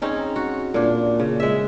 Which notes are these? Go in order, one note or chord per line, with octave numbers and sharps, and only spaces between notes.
C4 C#4 D#4 G#4
F#4
A#2 D4
C#3
G#3 E5